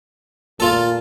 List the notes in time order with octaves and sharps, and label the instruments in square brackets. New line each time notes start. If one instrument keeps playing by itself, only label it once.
[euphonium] A#2 [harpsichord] F4 A4